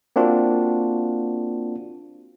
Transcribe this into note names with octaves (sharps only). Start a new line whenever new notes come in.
A#3 C4 D4 F4 F#4